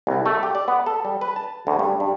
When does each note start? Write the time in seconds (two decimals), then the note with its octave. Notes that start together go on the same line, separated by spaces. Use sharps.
0.07 C2
0.26 A3
0.43 G4
0.55 D5
0.68 B3
0.86 A4
1.05 G3
1.21 B4
1.36 A5
1.67 D2
1.79 G2
2.00 G2